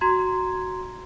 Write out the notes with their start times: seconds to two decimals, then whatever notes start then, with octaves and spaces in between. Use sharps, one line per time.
0.01 F#4 A#5 C6 G#6